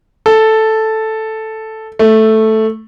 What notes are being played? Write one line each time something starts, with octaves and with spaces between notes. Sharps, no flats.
A4
A3